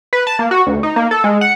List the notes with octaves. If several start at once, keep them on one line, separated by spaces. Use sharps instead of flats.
B4
A5
A#3
F#4
D2
D#4
A#3
A4
G#3
F#5